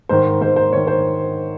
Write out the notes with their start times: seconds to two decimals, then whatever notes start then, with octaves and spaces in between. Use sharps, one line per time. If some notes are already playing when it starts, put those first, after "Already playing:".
0.09 G#2 D#3 C5
0.41 G#2 D#3 C5
0.56 C5
0.72 G#2 C#5
0.76 D#3
0.87 C5